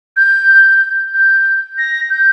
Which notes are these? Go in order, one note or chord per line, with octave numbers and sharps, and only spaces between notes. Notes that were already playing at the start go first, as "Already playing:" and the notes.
G6
G6
A#6
G6